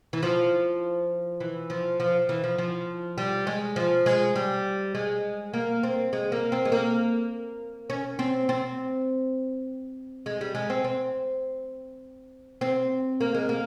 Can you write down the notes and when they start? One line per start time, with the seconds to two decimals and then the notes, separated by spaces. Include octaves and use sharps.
0.13 E3
0.23 F3
1.40 E3
1.70 F3
2.00 F3
2.29 E3
2.44 F3
2.58 F3
3.18 G3
3.47 G#3
3.76 F3
4.06 G#3
4.36 G3
4.95 G#3
5.54 A#3
5.83 C4
6.13 G#3
6.32 A#3
6.52 C4
6.65 G#3
6.72 A#3
7.90 C#4
8.19 C4
8.49 C4
10.26 G#3
10.41 G3
10.55 G#3
10.70 C4
10.84 C4
12.61 C4
13.20 A#3
13.35 G#3
13.49 A#3